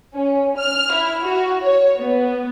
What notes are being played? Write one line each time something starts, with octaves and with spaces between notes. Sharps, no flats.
C#4
F6
E4
F#4
C#5
B3